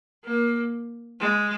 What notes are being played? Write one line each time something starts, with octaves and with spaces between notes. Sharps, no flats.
A#3
G#3